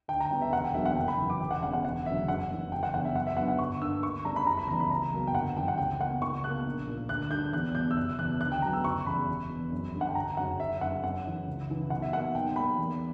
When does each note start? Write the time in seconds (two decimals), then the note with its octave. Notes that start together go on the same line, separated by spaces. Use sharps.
0.08 D2 G5
0.20 A#5
0.31 C#3 G3 B3 G5
0.42 E5
0.53 E1 F#5
0.64 G5
0.74 E2 D3 F#3 A#3 E5
0.85 F#5
0.96 F#1 G5
1.08 B5
1.18 F#2 E3
1.30 D6
1.40 E1 G5
1.51 F#5
1.63 E2 C#3 G3 F#5
1.73 F#5
1.83 E1 F#5
2.06 D2 C#3 F#3 E5
2.28 F#2 F#5
2.50 E3 G3 A#3
2.71 F#1 G5
2.83 F#5
2.94 E2 D3 F#5
3.05 E5
3.15 F#2 F#5
3.27 E5
3.37 D3 F#3 B3 F#5
3.48 F#5
3.59 G1 C#6
3.81 G2 D3 A#3 E6
4.03 D2 C#6
4.25 C#3 G3 B3 A#5
4.36 B5
4.47 F#1 A#5
4.57 B5
4.68 E2 C#3 E3 G3 A#5
4.80 B5
4.90 C#2 A#5
5.12 B2 F#3 A#3
5.27 G5
5.34 G1 F#5
5.56 F#2 E3 G3 G5
5.68 F#5
5.78 C#2 G5
6.00 B2 A#3 F#5
6.22 C#2 C#6
6.44 B2 A#3 F#6
6.66 A#1
6.87 A#2 A#3
7.09 D2 F#6
7.31 D3 G3 G6
7.53 E2 F#6
7.75 B2 G3 G6
7.91 E6
7.97 F#1 F#6
8.19 E2 B2 F#6
8.40 D2 F#6
8.52 G5
8.62 C#3 F#3 B3 A#5
8.73 E6
8.84 F#1 C#6
9.06 E2 C#3 G3 B5
9.28 E1
9.50 E2 B2
9.71 F#2
9.94 D3 G3
10.01 F#5
10.09 G5
10.15 G1 A#5
10.37 F#2 C#3 F#3 F#5
10.60 F#1 E5
10.81 F#2 C#3 F#5
11.04 F#2 F#5
11.26 C#3 E3
11.48 C#2
11.70 C#3 E3
11.90 B1 F#5
12.02 E5
12.13 B2 A#3 F#5
12.34 B1 G5
12.56 B2 G3 A#3 B5
12.78 E2